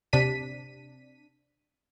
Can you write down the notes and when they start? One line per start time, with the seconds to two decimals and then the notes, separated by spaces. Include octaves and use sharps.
0.13 C3 D4 B6 D#7